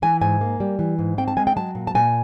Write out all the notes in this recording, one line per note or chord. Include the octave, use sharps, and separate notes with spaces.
E3 G#5
G#2 G#5
A#3
G3
E3
G#2
C4 G5
A5
G#3 G#5
G5
F#3 A5
A#2
A5
A#2 G#5